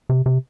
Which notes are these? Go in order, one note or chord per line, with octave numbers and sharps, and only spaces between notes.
C3
C3